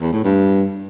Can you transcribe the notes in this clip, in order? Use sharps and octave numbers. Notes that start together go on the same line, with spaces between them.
E2
A2
G2